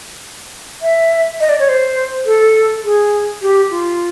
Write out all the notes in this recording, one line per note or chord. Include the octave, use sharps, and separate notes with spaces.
E5
D#5
D5
C#5
C5
A4
G#4
G4
F4